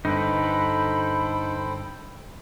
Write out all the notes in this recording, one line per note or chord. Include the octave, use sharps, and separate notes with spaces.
G2 D3 D#4 A4 B4 C5 G5 B5